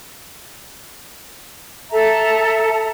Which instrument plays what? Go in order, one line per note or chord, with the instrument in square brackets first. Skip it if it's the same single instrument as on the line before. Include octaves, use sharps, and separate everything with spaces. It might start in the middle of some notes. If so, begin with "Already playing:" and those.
[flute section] A4 E5 A5 A#5